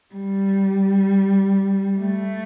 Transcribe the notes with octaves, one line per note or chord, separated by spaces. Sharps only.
G3
A3